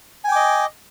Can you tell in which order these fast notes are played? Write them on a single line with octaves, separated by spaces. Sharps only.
G#5 G5 D6 D#5